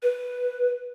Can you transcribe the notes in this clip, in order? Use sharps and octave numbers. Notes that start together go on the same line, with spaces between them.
B4